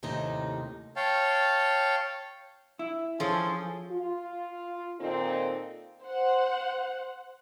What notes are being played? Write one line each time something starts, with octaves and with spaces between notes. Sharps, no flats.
D#2 A2 C3 D#3 D#4
C#5 F5 G5 A5
E4
F3 C#4 G#4 A4 C6
F4
A#2 D#3 C4 D#4 F4 A4
C5 F#5